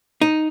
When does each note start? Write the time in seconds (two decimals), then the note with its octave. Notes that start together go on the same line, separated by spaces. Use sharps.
0.22 D#4